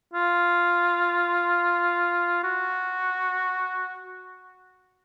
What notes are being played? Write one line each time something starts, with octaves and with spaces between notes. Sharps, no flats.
F4
F#4